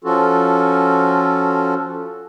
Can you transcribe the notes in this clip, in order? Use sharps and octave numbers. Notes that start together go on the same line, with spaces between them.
F3 C#4 F4 F#4 A4